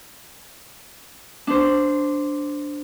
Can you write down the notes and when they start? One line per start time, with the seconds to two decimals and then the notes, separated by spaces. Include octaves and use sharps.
1.47 D4 C5